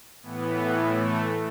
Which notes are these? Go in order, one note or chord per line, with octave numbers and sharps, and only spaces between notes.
A2 E3 B3
A3